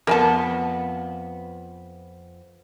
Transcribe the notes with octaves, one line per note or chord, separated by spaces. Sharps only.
F2 B3 A#4 G#5 A5